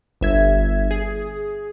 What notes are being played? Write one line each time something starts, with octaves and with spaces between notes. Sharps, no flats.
G1 E5 G#6
G#4